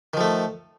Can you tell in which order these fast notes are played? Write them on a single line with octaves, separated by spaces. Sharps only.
D#3 F3 A3